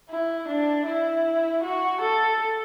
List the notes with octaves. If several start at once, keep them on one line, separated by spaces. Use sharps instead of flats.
E4
D4
E4
F#4
A4